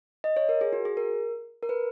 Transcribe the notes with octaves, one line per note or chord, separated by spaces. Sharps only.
D#5
C#5
A#4
G#4
F#4
G#4
A#4
A#4
B4